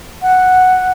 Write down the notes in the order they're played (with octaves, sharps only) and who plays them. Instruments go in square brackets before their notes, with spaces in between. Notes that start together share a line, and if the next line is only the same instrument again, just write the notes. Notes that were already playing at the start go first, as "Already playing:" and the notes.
[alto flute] F#5